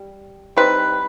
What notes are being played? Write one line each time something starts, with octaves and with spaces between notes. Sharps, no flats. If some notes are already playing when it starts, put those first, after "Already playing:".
Already playing: G3
G3 C4 D#4 B4